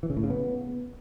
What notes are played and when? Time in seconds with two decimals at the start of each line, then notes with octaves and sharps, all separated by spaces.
0.03 E3
0.10 C#3
0.17 A2
0.23 C#3
0.30 B3